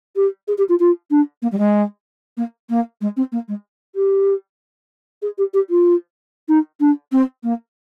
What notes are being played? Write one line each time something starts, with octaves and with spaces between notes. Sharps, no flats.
G4
G#4
G4
F4
F4
D4
A#3
G3
G#3
A#3
A#3
G#3
C4
A#3
G#3
G4
G#4
G4
G4
F4
D#4
D4
C4
A#3